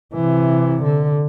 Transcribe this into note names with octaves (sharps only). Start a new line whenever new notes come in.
C3 E3
D3